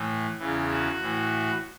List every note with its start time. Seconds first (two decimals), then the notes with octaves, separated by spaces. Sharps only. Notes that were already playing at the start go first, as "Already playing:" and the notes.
Already playing: A2 E3
0.39 E2 C#3 E3
0.70 F#4
1.01 A2 E3